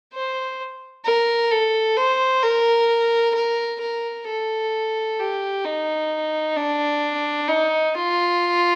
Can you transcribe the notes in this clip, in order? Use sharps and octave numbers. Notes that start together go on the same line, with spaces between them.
C5
A#4
A4
C5
A#4
A#4
A#4
A4
G4
D#4
D4
D#4
F4